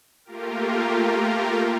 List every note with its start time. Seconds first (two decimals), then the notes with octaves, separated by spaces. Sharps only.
0.25 A3 A#3 F4 G4 A#4